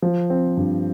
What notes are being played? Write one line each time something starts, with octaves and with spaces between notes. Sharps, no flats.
F3
C4
G2